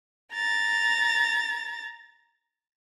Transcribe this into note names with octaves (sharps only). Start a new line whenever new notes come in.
A#5 A6